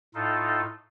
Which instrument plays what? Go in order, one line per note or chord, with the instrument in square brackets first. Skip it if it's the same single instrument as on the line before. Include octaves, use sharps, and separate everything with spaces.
[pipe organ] A2 D#4 F4 A4